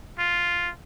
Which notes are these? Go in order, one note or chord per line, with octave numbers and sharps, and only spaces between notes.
F4